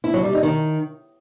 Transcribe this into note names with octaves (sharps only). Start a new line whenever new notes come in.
E4
F#3
G3
D#4
D#3